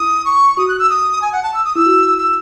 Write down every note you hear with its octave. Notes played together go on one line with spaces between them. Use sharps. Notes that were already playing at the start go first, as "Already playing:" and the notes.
Already playing: E4 D#6
C#6
F#4 D#6
F#6
E6
D#6
G#5
F#5
A5
E6
D#6
E4 E6
F#4
E6